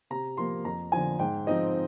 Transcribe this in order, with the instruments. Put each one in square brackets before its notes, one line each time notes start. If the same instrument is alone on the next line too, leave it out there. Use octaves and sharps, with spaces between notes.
[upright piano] C3 A#5
F3 A#3 C6
F2 A#5
D3 F3 G#5
G#2 G5
F3 C4 D#4 D#5